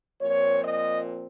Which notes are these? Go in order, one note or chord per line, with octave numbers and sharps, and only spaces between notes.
A#2 F3 C4 C#5
D#5